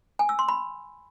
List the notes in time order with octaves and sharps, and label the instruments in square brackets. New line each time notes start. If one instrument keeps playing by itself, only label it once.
[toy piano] G#5
E6
C6
B5